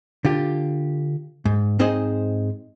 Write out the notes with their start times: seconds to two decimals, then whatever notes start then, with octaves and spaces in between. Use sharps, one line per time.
0.25 D3 F4 G4
1.45 G#2
1.79 G#2 C4 D#4 G#4 C5 D#5